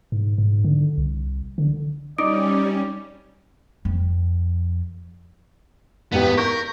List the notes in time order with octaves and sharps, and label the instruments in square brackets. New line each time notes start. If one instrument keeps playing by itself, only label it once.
[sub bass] G#2
G#2
D3
C2
D3
[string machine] G3 C#4 [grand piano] D#4 [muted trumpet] D5 [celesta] D6 D#6 D7
[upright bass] F2
[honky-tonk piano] G#1 E2 G4 [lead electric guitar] B3
[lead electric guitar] A#4 [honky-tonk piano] C#6 G6